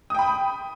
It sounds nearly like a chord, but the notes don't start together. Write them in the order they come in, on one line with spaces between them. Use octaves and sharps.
D#6 G5 B5